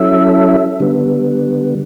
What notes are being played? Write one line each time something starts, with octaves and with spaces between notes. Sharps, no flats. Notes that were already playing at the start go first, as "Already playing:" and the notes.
Already playing: F#3 C#4 E4 A4 E5
D3 G3 B3